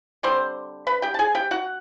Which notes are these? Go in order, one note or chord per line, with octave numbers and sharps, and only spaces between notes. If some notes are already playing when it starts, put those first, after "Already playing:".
D3 G3 C4 C5 C6
B4 B5
G4 G5
A5
G#4 G#5
G4 G5
F#4 F#5